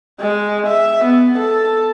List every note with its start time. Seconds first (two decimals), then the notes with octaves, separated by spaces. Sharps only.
0.21 G#3
0.67 E5
1.04 B3
1.38 A4